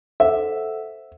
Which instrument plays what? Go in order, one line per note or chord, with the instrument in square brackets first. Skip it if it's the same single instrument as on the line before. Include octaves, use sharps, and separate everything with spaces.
[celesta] A4 C5 F#5 [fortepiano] E5